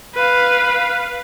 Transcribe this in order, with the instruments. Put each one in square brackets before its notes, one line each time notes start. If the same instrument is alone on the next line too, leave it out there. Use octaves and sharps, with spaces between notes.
[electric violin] B4 F5